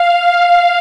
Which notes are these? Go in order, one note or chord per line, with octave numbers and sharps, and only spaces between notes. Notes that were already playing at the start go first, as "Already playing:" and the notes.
Already playing: F5
F5